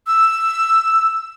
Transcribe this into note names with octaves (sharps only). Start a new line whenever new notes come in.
E6